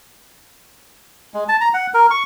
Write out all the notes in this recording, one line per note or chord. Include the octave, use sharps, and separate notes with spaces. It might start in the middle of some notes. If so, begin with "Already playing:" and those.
G#3
A5
A#5
F#5
A#4
C#6